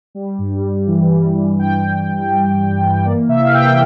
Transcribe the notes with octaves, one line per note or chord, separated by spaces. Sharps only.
G3
G2
G2
E3
G3
G2
G2 G5
E3
G3
G2
G2
E3
A#3 D5
C3 E5
F5
C3 G5